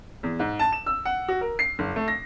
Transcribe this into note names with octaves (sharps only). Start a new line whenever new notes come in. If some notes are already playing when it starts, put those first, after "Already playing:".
E2
G#2
A5
E7
E6
F#5
F#4
A#4
C7
F#1
A3
A#6